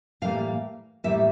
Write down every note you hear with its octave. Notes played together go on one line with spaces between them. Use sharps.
A2 E3 G3 A#3 F5
A2 E3 G3 A#3 E5